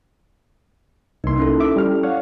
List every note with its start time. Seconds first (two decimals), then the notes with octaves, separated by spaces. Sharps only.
1.24 C2 A#3 D#4 C6
1.38 C#4 E4 A4
1.60 E5 D6
1.76 G3 F6
2.03 C#5 D5 F5 F#5